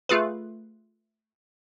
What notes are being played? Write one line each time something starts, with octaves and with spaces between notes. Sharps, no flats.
A3 F4 G#4 B4